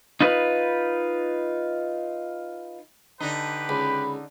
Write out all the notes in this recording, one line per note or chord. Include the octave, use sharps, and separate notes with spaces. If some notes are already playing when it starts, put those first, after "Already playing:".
D#4 F4 B4
D3 D#4 G4 B4
C#2 B5